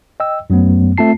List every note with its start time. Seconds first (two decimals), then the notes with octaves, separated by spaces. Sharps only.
0.20 D#5 G5 E6
0.50 F#2 F#3 A3 B3
0.98 A3 C4 F4 A5 C7